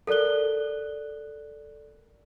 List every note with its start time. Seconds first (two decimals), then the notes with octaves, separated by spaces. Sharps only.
0.07 A4 A#4 D5 F#6 G7